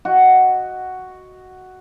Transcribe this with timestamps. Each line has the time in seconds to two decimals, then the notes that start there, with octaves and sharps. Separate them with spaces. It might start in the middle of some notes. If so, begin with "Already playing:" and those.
0.05 F#4 D#5